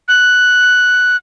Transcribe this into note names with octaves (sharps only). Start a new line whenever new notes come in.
F#6